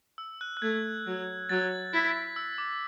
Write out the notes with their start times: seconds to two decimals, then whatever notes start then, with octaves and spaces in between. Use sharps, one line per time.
0.18 E6
0.41 F#6
0.57 F#6
0.62 A3 G#6
1.06 F#3
1.49 F#3 A6
1.93 E4 B6
2.36 E6
2.58 D6